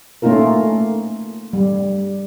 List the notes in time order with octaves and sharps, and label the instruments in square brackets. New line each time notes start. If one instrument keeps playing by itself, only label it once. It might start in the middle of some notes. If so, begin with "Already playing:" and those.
[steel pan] A3 A#3 C#4 D#4 F4 A#4
G3